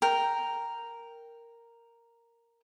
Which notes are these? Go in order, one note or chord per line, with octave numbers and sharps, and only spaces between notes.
A#4 G5